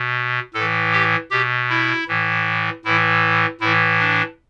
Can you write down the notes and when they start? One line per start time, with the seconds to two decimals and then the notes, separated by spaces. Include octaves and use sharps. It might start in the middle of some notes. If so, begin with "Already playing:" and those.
Already playing: B2
0.54 A2 A4
0.59 E3
0.93 G4
1.31 B2 G4
1.69 E4
2.08 A2 E3
2.85 A2 E3 E4
3.61 A2 E3 E4
3.99 D4